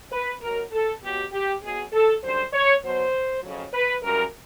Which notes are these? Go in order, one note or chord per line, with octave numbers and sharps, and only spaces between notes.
B4
B2 F#3 A#4
A4
B2 F#3 G4
G4
B2 F#3 G#4
A4
F#2 D3 G3 C5
C#5
B2 F#3 C5
F2 C#3 F#3
B4
F#2 C#3 E3 G3 A#4